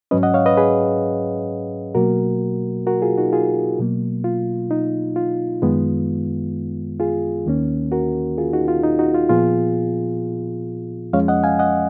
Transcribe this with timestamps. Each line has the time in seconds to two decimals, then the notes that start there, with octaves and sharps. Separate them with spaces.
0.11 G#2 F#3 C#4 B4 D#5
0.23 D#5 F#5
0.34 C#5 F5
0.46 B4 D#5
0.57 G#4 B4
1.95 B2 F#3 A#3 F#4 A#4
2.87 F#4 A#4
3.02 F4 G#4
3.17 D#4 F#4
3.33 F4 G#4
3.79 B2 F#3 A#3
4.24 F4
4.71 D#4
5.16 F4
5.62 F#2 D#3 G#3 B3
7.00 F4 G#4
7.46 D#2 D#3 A#3 C#4
7.92 F#4 A#4
8.38 F4 G#4
8.53 D#4 F#4
8.68 F4
8.83 D#4
8.99 D#4 F#4
9.14 F4
9.29 A#2 F3 B3 F4 G#4
11.13 F2 F3 G#3 C#4 C#5 F5
11.28 D#5 F#5
11.43 F5 G#5
11.59 D#5 F#5